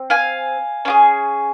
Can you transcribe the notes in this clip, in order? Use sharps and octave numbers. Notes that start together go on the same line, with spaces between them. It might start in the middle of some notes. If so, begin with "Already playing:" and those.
Already playing: C4
F5 G#5
C#4 F4 G#4